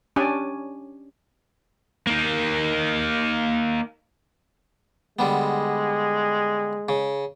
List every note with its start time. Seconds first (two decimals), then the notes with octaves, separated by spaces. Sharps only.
0.16 C#4 D4 G4 D5 G#5
2.07 A#3 D#4
5.19 D3 G3 G#3 B3
6.89 C#3